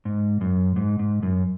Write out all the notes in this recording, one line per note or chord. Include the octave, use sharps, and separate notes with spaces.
G#2
F#2
G#2
G#2
F#2